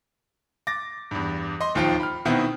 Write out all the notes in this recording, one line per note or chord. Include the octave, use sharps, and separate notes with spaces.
D6 A6 A#6
E2 G2
D#5 C6
D1 D#2 F3 F4 G5
B5 F6
B2 D#3 B3 C4 E4